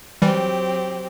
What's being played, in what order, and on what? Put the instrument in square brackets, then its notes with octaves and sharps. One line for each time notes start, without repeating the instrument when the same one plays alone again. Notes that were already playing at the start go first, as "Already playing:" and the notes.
[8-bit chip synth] E3 G3 [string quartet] F#3 C4 G4